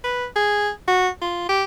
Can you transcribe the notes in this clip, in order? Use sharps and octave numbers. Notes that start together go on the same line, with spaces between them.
B4
G#4
F#4
F4
G4